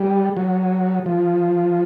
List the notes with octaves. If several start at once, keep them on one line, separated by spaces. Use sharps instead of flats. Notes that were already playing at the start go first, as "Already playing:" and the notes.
Already playing: G3
F#3
F3